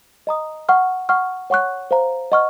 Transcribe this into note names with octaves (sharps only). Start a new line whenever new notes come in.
D#5 A#5 D#6
F#5 C#6 F6
F#5 C#6 F6
C#5 F#5 C#6 F#6
C5 F5 A#5
D#5 F#5 C#6 F6